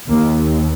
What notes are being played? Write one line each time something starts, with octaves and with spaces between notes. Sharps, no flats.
D#2 A#3